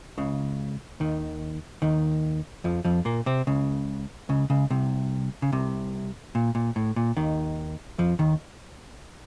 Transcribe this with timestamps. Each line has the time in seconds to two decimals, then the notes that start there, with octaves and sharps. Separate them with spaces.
0.17 C#2 C#3
1.00 D#2 D#3
1.82 D#2 D#3
2.64 F2 F3
2.85 F2 F3
3.05 A#2 A#3
3.26 C3 C4
3.47 C#2 C#3
4.29 C#2 C#3
4.50 C#2 C#3
4.70 C2 C3
5.42 C#3
5.52 C2 C3
6.35 A#2
6.55 A#2
6.76 A2
6.96 A#2
7.17 D#2 D#3
7.98 F2 F3
8.19 D#2 D#3